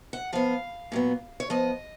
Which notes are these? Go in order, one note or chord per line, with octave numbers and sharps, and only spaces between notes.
F#5
F3 B3 F5
A#2 F#3 B3
C#5
F3 B3 D#5